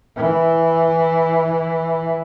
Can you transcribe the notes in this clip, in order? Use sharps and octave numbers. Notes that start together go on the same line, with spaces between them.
E3 E4